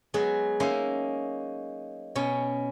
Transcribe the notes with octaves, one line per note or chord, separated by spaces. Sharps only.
F#3 G#3 B3 F#4 G#4
A#3 C#4 D#4 E5 C6
B2 C#4 C#5